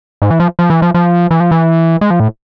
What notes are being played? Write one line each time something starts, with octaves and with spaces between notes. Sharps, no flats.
G#2
E3
F3
F3
E3
F3
F3
E3
F3
E3
G#3
F3
A2